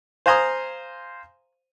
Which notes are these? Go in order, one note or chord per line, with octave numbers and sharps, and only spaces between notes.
C5 F5 G#5 A#5 C6 D#6